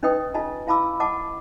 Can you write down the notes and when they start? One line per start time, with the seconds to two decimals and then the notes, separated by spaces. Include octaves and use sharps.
0.03 C#4 D#4 B4 D#5 G5 D#6
0.34 D#4 F4 D#5 G#5 A5
0.67 E4 F5 A5 B5 D6 E6
1.00 D#5 F#5 A5 D6